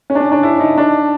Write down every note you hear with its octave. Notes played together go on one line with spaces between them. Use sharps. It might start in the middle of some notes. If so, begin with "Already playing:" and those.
C#4
D4
C#4
D4
E4
D#4
D4